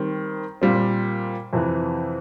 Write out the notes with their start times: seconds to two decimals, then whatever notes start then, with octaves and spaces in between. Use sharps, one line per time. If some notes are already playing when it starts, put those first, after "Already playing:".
Already playing: D#3 G3 C4
0.62 A#2 G3 C4
1.53 F2 C3 E3